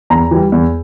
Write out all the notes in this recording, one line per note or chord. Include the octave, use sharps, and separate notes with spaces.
E2 A#5
E3 G3
E2